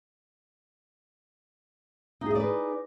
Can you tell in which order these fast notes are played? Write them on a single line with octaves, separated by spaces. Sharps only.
D#4 G#4 D#5 D5 B4